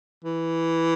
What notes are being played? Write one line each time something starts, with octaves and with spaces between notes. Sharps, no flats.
E3